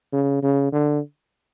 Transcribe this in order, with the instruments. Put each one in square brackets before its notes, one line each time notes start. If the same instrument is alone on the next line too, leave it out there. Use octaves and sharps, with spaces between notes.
[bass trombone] C#3
C#3
D3